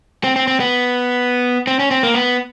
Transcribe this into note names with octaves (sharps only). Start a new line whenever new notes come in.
C4
C4
C4
B3
C4
C#4
C4
A#3
B3